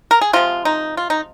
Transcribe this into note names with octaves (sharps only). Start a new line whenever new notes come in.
A#4
G#4
C3 F3 G#3 F4
D#4
F4
D#4